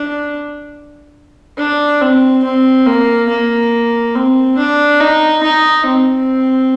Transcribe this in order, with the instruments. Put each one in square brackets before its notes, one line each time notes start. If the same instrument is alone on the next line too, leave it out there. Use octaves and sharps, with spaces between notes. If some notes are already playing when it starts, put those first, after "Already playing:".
Already playing: [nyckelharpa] D4
D4
C4
C4
A#3
A#3
C4
D4
D#4
D#4
C4